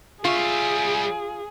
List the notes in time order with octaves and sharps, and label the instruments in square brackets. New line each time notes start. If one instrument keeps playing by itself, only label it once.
[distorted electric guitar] G3 E5 [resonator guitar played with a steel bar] F4 [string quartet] G#4